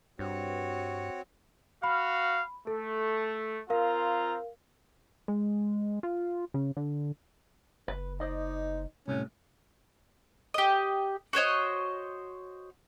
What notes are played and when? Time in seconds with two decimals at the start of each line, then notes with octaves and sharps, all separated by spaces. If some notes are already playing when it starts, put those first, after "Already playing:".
0.19 G2 C4 F#4 C#5
1.84 F#4 F5 B5
2.67 A3 A4
3.70 C4 F4 A#4 F5 A#5
5.28 G#3
6.03 F4
6.54 C#3
6.77 D3
7.88 F#1 B4
8.20 D#4 C5 D5 D#5
9.08 C2 A2 C#4
10.54 G4 D#5
11.33 F#4 C5 C#5 D#5